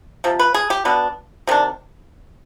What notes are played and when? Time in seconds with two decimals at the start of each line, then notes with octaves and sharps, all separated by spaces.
0.24 C3 F3
0.39 B4
0.54 G#4
0.70 G4
0.85 B2 B3 D4
1.47 C3 D#3 D4